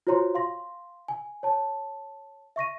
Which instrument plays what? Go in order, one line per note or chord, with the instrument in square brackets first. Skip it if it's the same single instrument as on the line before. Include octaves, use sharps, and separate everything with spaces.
[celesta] F4 F#4 C5 C#5 A#5 C6
F5 C6 A#6
G#5
C#5 A5
E5 C#6 A#6 D#7